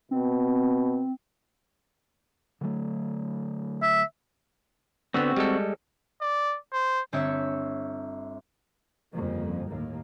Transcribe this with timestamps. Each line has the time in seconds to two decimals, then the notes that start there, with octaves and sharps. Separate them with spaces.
0.11 B2 C4
2.61 D3 F#3 A3
3.83 E5
5.14 D3 B3 C4 F#4 E6
5.36 G3 G#3 A4
6.22 D5
6.73 C5
7.13 G1 C4 C#5 E5 E6 C#7
9.13 G1 F2 C#3 G3 A#3
9.67 D#2 A2 A#3